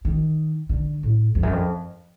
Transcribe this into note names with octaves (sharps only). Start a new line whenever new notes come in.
D#3
D3
A2
F2
F#2
F2